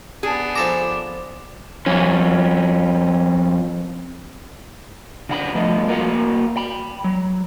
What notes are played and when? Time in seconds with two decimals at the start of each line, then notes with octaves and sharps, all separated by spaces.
0.23 B3 D4 G#4
0.56 F3 A4 A#5 D6 E7
1.86 F2 C#4
5.29 C#3 D4 F#5 B5
5.55 G2 F3 A3 B3 D#5
5.88 A#3 F#4 A#4 F5 F#5
6.57 G5 B5
7.04 F#3